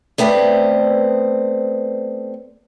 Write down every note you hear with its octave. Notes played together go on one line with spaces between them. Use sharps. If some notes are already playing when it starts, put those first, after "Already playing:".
A3 B3 C4 B4 D5